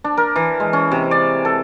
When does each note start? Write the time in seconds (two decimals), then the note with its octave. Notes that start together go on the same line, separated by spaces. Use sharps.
0.04 D4
0.17 A#4
0.36 E3
0.60 G#3
0.73 C#4
0.92 C3
1.11 D5
1.45 A4